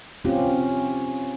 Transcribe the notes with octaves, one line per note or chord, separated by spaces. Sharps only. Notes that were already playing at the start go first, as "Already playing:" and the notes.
C4 C#4 F4 G4